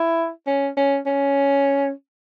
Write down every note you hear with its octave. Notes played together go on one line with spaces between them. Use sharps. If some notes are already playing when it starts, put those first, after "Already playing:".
Already playing: E4
C#4
C#4
C#4